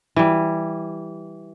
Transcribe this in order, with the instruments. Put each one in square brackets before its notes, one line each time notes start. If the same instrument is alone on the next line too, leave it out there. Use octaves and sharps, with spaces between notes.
[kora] E3 G3